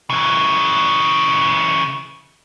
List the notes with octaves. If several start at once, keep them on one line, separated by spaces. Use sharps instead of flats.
C#3 E3